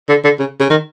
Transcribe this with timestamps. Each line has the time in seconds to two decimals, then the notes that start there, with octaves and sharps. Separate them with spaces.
0.09 D3
0.25 D3
0.39 C#3
0.60 C#3
0.70 D#3